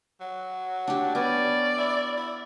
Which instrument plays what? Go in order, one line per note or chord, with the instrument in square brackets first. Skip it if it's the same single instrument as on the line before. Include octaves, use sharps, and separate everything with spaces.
[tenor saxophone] F#3
[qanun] D4 G4
[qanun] B3 [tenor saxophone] C#4 [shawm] D5
[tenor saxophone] E4
E4